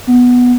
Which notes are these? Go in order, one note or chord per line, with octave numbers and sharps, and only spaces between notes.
B3